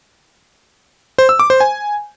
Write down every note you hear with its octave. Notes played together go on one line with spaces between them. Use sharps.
C5
E6
D6
C5
G#5